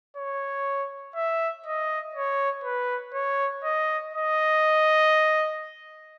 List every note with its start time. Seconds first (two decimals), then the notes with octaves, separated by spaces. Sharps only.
0.17 C#5
1.16 E5
1.66 D#5
2.15 C#5
2.64 B4
3.14 C#5
3.64 D#5
4.13 D#5